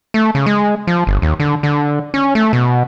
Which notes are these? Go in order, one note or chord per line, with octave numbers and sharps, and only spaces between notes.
A3
C#3
G#3
F3
G1
D#2
D3
D3
C#4
A3
B2